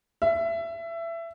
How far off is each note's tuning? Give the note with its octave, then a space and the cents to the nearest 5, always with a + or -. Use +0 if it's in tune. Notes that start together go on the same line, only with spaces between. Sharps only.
E5 +20